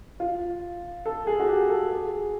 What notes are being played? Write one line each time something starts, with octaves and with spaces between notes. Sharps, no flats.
F4
A4
G#4
F#4
G4
A4
G#4